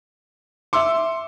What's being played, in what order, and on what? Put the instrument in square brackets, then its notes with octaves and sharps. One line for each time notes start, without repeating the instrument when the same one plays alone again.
[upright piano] E5 E6 C#7 [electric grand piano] C6 D6